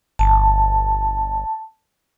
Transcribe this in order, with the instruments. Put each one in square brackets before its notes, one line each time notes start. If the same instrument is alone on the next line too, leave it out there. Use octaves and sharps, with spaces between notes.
[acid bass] G1 [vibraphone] A5